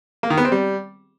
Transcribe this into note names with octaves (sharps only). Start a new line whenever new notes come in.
A#3
D#3
B3
C4
G3